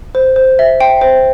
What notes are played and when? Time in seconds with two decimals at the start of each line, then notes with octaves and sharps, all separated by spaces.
0.15 C5
0.36 C5
0.59 E5
0.81 G5
1.01 C5